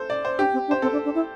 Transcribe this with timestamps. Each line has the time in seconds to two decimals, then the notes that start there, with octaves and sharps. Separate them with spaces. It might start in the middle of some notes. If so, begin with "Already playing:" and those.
Already playing: A4 C5
0.10 D5
0.25 C5
0.39 D4 G4
0.53 C4
0.68 D4
0.71 C5
0.82 C4 A4
0.93 D4
1.05 D4
1.15 E4